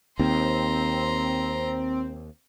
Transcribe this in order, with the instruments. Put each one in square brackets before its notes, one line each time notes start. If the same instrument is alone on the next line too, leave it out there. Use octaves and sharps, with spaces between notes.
[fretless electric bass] D#2 [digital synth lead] C4 [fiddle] A#5 C6